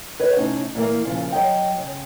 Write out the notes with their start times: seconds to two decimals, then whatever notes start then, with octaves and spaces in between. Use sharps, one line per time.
0.20 B4 C#5 D#5
0.37 A2 C3 C#4 D#4
0.75 A#2 E3 A#3
1.05 A#2 C#3 F3
1.32 F#3 D#5 G5
1.78 C#3